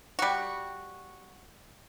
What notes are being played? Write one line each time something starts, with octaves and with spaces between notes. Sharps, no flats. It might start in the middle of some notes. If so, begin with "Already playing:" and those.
G3 F#4